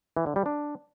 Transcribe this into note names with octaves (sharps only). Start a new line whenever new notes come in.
E3
D3
G3
D4